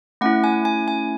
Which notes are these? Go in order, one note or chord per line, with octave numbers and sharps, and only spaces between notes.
A3 C#4 E4 F#5
G#5
G#5
G#5